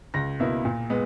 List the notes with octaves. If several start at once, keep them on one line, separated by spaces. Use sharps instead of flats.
C#2 A#6
B2 A#3 E4
A#2
G#3 B3